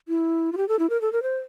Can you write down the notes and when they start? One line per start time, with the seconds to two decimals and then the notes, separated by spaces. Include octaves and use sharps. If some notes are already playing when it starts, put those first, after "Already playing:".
0.08 E4
0.53 F4
0.57 G4
0.69 A4
0.79 E4
0.90 A#4
1.01 A4
1.13 A#4
1.23 C5